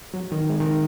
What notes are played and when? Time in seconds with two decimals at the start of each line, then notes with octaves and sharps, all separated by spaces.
0.14 F#3
0.32 D#3
0.49 G#3
0.60 D#3